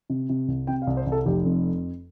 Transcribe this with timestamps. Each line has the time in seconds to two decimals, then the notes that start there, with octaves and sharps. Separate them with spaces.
0.10 C3
0.29 C3
0.48 C2
0.67 C3 G5
0.82 F5
0.87 C2
0.97 C5
1.07 C2
1.12 A4
1.25 F1 G4
1.45 F2